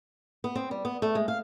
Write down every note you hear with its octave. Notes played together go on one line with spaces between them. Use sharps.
B3
C4
G3
B3
A3
G#3
F5